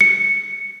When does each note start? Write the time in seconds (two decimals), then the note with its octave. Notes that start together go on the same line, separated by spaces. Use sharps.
0.01 C#7